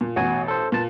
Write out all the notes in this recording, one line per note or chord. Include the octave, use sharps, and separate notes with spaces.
A#2
A1 B2 F#4 G#5
A4 C5
A#2 B4 A5